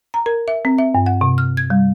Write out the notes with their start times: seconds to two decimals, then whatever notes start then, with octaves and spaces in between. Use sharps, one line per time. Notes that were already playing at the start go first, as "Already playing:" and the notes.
0.14 A#5
0.26 A#4
0.48 E5
0.65 C4
0.78 E5
0.95 G2
1.06 F#5
1.21 C3
1.38 F6
1.57 G#6
1.70 G3